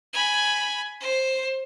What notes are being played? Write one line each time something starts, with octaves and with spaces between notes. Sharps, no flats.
G#5 B5
C5